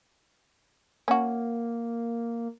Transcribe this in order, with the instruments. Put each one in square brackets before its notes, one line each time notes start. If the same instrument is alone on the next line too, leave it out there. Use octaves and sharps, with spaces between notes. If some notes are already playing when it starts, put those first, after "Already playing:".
[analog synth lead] A#3 [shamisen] C#4 F#4